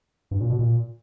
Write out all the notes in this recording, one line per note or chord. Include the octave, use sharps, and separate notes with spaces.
G2
A#2
B2
A#2